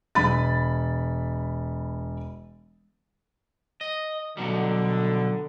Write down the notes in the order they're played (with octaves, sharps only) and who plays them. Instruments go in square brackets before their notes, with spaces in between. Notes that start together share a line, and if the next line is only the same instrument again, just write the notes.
[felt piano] E1 B5 A6
[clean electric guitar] D#5
[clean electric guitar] B2 F#3 G3 [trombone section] D3